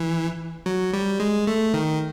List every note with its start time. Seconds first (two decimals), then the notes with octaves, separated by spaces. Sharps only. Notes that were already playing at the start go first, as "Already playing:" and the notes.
Already playing: E3
0.66 F#3
0.93 G3
1.20 G#3
1.47 A3
1.74 D#3